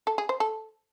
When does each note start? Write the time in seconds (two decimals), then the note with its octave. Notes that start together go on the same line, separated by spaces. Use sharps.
0.07 A4
0.18 G#4
0.29 C5
0.40 A4